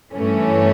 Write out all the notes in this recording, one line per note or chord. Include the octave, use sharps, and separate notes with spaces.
G2 E3 A3 C#4